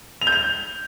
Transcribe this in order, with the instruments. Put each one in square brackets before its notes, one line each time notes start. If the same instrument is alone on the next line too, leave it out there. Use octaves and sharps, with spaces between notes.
[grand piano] F7
G6
F7